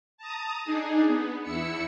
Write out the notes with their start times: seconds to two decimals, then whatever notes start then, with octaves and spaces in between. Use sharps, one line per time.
0.18 A5 A#5 D#6
0.64 D4 D#4 G#4
1.07 B3
1.43 E2 E4 E6 C#7